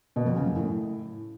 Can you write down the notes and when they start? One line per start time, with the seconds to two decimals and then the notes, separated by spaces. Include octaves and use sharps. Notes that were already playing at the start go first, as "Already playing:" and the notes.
0.16 B2
0.26 F2
0.36 C#3
0.46 F#2
0.56 A2